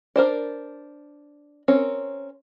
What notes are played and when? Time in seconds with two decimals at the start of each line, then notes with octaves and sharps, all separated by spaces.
0.16 D4 A#4 C5 D5
1.68 C4 C#4 A#4 C#5